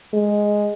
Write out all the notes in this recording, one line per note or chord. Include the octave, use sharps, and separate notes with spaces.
G#3